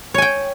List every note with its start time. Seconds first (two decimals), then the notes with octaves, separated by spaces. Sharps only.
0.14 C#5
0.18 G#5
0.22 G5